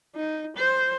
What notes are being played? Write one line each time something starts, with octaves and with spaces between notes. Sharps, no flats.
D#4
C5